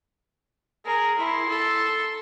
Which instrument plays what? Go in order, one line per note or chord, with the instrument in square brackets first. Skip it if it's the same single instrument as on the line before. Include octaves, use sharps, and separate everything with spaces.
[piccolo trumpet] G#4 [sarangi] A#4
[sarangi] E4 [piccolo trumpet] C6
[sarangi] A4